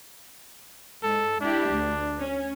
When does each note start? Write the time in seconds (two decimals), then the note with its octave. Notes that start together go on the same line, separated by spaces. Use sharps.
1.03 G#2 A4
1.41 D4 E4 G4
1.71 D2
2.19 C#4